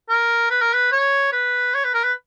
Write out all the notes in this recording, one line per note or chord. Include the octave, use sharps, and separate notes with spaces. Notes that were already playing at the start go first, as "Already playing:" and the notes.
A#4
B4
A#4
B4
C#5
B4
C#5
B4
A#4
B4